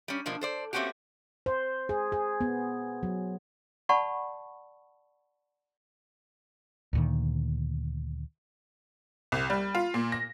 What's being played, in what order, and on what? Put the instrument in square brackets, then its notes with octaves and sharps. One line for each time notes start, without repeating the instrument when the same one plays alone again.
[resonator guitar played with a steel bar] G3 C#4
B2 F3 A#3 D4
A4 C5 D5
A3 A#3 C4 C#4 F#4 G4
[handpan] C5
G#4
G#4
B3
F#3
[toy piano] D5 F#5 A5 B5 C#6
[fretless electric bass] D2 A#2 D#3
[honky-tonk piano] C2
G3
F4
A#2
A#6